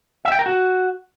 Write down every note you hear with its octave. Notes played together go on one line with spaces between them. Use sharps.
E5
G5
A#4
F#4